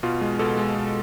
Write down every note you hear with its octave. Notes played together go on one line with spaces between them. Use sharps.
B2 F4
G#3
B2 A4
G#3
B2